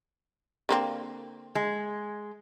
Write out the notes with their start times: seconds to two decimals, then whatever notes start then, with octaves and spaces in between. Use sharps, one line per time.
0.69 D3 A#3 C4
1.55 G#3